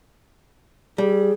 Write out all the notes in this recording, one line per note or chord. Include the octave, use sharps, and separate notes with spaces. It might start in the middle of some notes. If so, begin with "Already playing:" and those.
G3 G#4